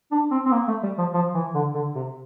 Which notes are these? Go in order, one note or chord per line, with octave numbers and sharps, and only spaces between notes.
D4
C4
C4
A#3
A3
G3
F3
F3
E3
D3
D3
C3